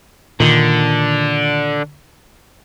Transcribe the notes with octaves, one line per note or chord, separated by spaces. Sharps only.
A#2 D3 D#3